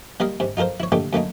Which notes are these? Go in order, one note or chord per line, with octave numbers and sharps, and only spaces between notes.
G3 A#3 D#4 D#5 F5
G#2 C3
D#4 F4 A4 A#4 C5
E4 C#5
A#2 D3 A3 D#4 G4
F#2 A3 A#3 D#4